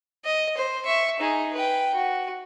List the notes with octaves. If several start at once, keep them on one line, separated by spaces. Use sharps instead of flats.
D#5
C5
E5 C#6
D#4 G#4
B4 G5
F#4